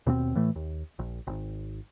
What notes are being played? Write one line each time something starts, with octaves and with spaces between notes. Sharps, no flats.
D#2 B2 B3 C4
A2 E3 A3
D#2
A#1
G#1